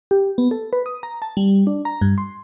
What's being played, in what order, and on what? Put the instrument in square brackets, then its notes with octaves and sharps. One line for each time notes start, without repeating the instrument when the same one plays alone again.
[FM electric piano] G4
B3
A4
B4
D#6
A#5
A5
G3
D4
A#5
G2
C6